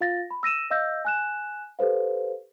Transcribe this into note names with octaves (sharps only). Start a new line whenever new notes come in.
F4 F5 A6 A#6
B5
E6 A#6 D#7 E7
D#5 F5 E6 G6 A#6
G#5 F#6 E7
G4 A4 B4 C5 F5